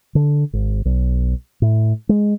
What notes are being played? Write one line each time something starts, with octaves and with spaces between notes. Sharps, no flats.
D3
G#1
B1
A2
G#3